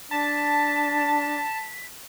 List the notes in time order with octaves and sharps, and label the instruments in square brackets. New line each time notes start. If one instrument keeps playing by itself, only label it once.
[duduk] D4 [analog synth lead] A5 [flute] B6